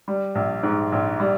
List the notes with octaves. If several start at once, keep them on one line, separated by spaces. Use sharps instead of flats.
G3
A#1
G#2
A#1
G3